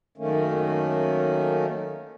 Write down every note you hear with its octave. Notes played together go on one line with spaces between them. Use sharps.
F#2 D#3 A3 A#3 C#4